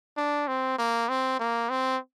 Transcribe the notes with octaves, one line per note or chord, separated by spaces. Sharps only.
D4
C4
A#3
C4
A#3
C4